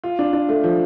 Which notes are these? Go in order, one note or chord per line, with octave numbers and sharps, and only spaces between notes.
F4
D4
D4
A3
F3